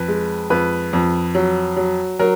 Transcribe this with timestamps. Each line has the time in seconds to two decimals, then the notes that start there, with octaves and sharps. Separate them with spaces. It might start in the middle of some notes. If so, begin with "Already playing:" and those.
Already playing: F2 B4
0.08 G#3
0.50 F2 B4
0.93 F2
1.35 F#3
1.77 F#3
2.19 F#3 A#4